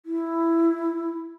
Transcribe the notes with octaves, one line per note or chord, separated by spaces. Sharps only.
E4